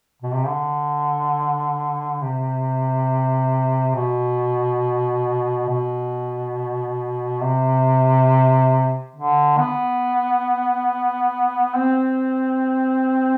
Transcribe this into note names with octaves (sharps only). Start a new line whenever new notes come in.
B2
C3
D3
C3
B2
B2
C3
D3
B3
C4